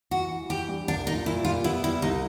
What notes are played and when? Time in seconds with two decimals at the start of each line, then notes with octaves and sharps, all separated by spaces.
0.11 E3 F#4
0.30 E3
0.49 E3 G4
0.68 G2
0.87 C2 D4
1.06 A#2 D#4
1.26 A#2 E4
1.45 G3 F4
1.64 B3 E4
1.83 G3 E4
2.02 C2 D#4